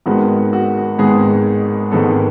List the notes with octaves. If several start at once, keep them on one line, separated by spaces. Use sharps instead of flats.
G#1 G#2 D#3 G#3 B3 F#4
F#4
G#1 G#2 D#3 G#3 B3 G#4
G#1 G#2 D#3 G#3 B3 A4